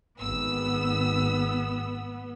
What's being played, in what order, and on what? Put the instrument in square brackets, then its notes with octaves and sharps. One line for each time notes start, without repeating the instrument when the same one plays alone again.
[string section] G#1 E6 [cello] B3